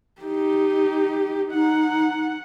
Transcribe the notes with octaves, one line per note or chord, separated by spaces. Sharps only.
D#4 G4
D#4 F#5